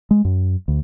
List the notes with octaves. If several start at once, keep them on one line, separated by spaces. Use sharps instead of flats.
G#3
F#2
D2